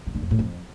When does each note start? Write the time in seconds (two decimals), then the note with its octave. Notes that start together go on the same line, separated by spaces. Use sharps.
0.07 C#3
0.15 D3
0.23 F2
0.31 A2
0.39 F2